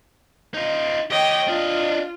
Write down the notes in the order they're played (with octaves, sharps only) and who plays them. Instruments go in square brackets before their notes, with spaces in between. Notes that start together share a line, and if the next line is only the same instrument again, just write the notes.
[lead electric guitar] D#4 F4
[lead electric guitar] G4 C#5 [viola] D#5 G5
[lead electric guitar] D4 D#5 [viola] F4